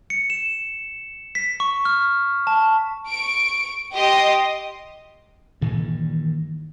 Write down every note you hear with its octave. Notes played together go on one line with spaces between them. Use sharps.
C#7
E7
B6
C#6
F6
A5
C#6 D7
G4 D#5 C6 D#6
G2 A#2 D#3 E3